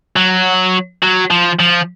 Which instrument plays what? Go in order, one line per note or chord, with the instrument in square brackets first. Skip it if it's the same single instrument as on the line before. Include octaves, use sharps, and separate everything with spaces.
[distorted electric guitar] F#3
F#3
F3
F3